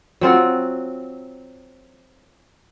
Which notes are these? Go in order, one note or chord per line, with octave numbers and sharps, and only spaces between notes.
F#3 C4 F4 F#5